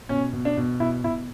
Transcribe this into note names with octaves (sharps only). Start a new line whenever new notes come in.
B2 C#4
B2
D4
B2
B2 E4
B2 E4